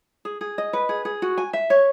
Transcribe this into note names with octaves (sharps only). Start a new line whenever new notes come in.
G#4
G#4
D#5
B4
G#4
G#4
F#4
G#5
E5
C#5